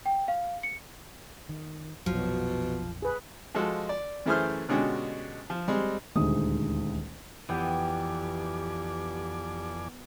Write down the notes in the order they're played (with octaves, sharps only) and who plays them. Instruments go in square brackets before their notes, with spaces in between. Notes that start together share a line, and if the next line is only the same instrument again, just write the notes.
[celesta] G5
F5
C#7
[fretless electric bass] D#3
[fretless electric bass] A#1 F2 [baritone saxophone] B2 [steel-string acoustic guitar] F3 [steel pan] F#3
[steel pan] G#4 B4
[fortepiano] F3 G#3 F#4 A4
D5
F#2 E3 A3 G#4 C5 F6
B2 D3 G#3 C#4 F#4 G4
F3
G3 G#3 C4
[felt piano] D#1 D2 G#3 D#4 D#6
[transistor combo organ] F2 D5 G#5 [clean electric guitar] E3 [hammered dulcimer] B3 G5 [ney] G4